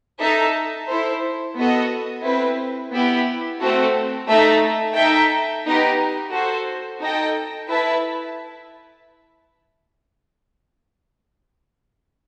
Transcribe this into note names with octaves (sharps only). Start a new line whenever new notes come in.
D#4 A4 E5 A5
E4 A4 C5
B3 F#4 A4 D#5
C4 E4 B4
B3 E4 G4
A3 C4 F#4 A4
A3 D#4 A4 E5
D#4 A4 E5 G5
B3 D#4 G4
F#4 A4 C5
D#4 A4 D#5 G5
E4 B4 E5 A5